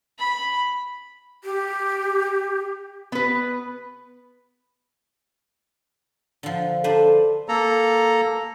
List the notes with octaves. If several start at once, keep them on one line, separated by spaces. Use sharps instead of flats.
B5
G4
B3 B4
D3 F3
D4 A4 B4 C5
A#3 A4 A#5